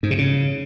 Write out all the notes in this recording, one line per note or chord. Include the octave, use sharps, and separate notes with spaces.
G#2
C3
C#3